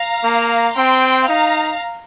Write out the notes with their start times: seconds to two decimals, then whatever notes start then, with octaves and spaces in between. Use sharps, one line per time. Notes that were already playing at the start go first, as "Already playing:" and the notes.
Already playing: F5 A#5
0.24 A#3
0.76 C4 G5 C6
1.28 D#4 F5 A#5